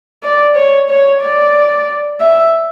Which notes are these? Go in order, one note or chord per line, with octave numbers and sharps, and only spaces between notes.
D5
C#5
C#5
D5
E5